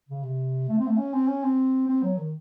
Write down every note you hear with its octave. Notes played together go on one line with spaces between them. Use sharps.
C#3
C3
A3
C4
A3
C#4
C4
C#4
C4
C4
F#3
D#3